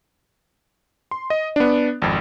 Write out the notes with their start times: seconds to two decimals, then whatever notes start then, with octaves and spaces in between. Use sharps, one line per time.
1.11 C6
1.30 D#5
1.56 B3 D4
2.02 G#1 F2